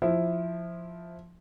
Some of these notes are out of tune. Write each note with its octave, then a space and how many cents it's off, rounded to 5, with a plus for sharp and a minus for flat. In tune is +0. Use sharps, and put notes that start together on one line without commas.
F3 +0 E4 +0